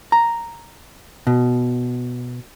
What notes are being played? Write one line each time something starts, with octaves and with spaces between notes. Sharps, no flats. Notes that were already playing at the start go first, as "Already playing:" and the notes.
A#5
B2